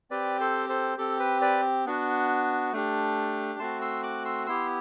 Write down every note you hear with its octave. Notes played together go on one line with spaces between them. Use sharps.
C4 G4 B4 D5
A4 C5
A4 C5
C4 G4 A4
B4
B4 D5
B3 D4 F#4
A3 D4 G4
A3 C4 F#4 A5 C6
C6 E6
D6 F#6
C6 E6
B3 E4 G4 C6 E6